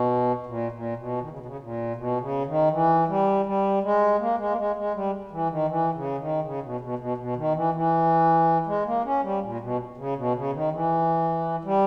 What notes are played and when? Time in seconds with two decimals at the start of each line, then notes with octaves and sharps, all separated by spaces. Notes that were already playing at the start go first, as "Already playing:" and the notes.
Already playing: B2
0.46 A#2
0.72 A#2
0.97 B2
1.21 D#3
1.30 C#3
1.39 B2
1.46 C#3
1.59 A#2
1.96 B2
2.21 C#3
2.46 D#3
2.71 E3
3.08 G3
3.46 G3
3.83 G#3
4.19 A#3
4.39 G#3
4.50 A#3
4.57 G#3
4.76 G#3
4.94 G3
5.31 E3
5.50 D#3
5.68 E3
5.94 C#3
6.18 D#3
6.43 C#3
6.62 B2
6.81 B2
6.99 B2
7.17 B2
7.36 D#3
7.55 E3
7.74 E3
8.67 G#3
8.85 A#3
9.04 C#4
9.23 G3
9.41 A#2
9.60 B2
9.97 C#3
10.16 B2
10.34 C#3
10.53 D#3
10.72 E3
11.64 G3